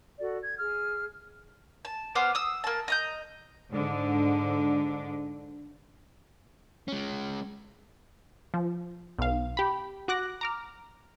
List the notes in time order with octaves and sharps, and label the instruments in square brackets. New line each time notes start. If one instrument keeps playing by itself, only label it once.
[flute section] F#4 A4 D5
G#6
G#4 F6
[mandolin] A5
B3 C5 D6 F6
D#6 E6
A#3 A5
D#5 A#5 G6
[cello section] G#2 D3
[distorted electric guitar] G#3 C#4
[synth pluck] F3
B1 F5
G4 B5
F#4 D6 F#6 A#6
A#5 D6 F6